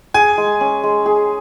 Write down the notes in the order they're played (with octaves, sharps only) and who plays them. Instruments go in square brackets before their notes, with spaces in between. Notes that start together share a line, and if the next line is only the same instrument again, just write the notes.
[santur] G#4 [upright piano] G#5
[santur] G#3
C#4
G#3
G#4